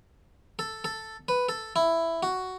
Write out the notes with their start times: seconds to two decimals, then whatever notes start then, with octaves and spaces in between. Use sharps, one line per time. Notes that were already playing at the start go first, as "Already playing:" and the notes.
0.59 A4
0.84 A4
1.28 B4
1.49 A4
1.76 E4
2.23 F#4